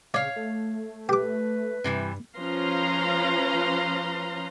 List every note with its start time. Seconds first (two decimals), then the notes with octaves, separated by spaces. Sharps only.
0.14 C#3 C#5 D5 F5
0.36 A3
1.09 G4 B4 D6
1.84 G2 C3 E3 G3
2.38 F3 C#4 B4 F5 A#5 C6